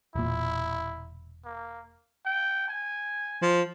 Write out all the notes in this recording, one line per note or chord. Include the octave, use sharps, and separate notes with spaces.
E1 A#2 E4
A#3
G5
G#5
F3